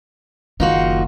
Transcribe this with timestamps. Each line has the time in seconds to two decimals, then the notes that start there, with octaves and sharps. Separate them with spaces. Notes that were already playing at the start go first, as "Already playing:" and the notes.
0.60 F#1 D#3 D#4 F4 F#4